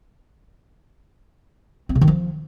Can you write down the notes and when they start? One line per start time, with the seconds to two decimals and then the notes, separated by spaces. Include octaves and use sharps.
1.89 C4
1.95 C#3
2.01 D#3
2.08 F3